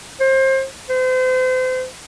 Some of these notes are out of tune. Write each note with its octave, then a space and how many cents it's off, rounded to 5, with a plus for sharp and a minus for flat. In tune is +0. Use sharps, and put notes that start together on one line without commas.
C5 +30
C5 -35